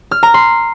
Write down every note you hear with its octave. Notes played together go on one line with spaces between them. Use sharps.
F6
A#5
C6